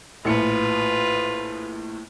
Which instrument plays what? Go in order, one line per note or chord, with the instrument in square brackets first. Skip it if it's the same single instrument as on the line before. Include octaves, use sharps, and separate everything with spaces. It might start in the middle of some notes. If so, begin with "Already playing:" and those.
[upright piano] A#1 A2 C#7 [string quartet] F4 B4